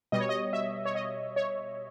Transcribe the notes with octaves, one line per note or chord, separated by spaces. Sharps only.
B2 G3 D#5
C#5
D#5
E5
C#5
D#5
C#5